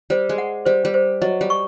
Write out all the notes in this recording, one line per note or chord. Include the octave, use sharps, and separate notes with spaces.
G3 C5
G#3
F#5
G3 C5
G3
C5
F#3 D#5
G3
C#6